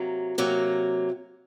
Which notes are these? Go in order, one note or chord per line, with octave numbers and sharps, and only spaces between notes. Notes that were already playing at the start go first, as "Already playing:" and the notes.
Already playing: C3 F#3 A#3
C3 F#3 A#3